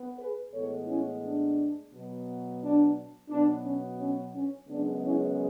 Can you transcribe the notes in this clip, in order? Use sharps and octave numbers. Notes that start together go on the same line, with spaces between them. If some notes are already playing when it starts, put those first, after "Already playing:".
Already playing: B3
G#4 B4
A2 E3 G#3 B3 A4 C#5
C#4 E4
D4
B2 F#3 B3
D4
B2 F#3 B3 D4
C#4
C#4
C#4
F#2 C#3 G#3 B3 D4
C#4 E4